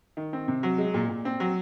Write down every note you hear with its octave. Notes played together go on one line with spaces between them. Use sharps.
D#3
C4
C3
F#3
G#3
A#2
A#2
C4
F#3